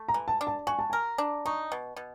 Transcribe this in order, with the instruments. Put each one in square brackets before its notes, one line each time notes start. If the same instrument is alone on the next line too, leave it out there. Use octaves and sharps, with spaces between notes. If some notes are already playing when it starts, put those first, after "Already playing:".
Already playing: [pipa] A3
[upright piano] A#5
[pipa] E3
[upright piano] A5
[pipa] D4
[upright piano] A5
[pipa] F#4 [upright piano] G#5
[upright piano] A5
G#5
[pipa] A#4
D4
[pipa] D#4 [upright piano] C#6
[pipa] B2
B2